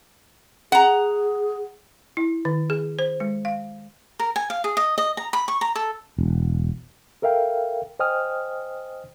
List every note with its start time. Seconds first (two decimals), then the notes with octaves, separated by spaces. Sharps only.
0.72 G#4 F#5 A#5
2.17 E4
2.45 D#3
2.70 G#4
2.99 C5
3.20 G#3
3.45 F5
4.20 A#4
4.36 G#5
4.50 F5
4.64 G#4
4.77 D#5
4.98 D#5
5.17 A#5
5.33 B5
5.48 C#6
5.61 A#5
5.75 A4
6.19 E1
7.22 A4 A#4 E5 F5 G5
7.99 C5 D#5 G5 G#5 D#6 F6